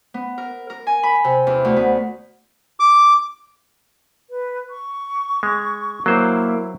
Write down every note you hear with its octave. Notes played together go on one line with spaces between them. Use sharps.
B3
A#4
A#4
G#5
B5
C3
E2
D2
B3
D6
B4
C#6
G#3
F#3 A#3 E4 C5